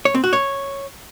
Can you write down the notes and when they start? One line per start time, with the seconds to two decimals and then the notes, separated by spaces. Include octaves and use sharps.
0.05 C#5
0.14 C4
0.24 F#4
0.33 C#5